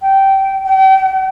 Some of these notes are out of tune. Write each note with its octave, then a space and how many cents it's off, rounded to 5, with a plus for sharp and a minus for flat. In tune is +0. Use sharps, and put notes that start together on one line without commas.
G5 -15
G5 -40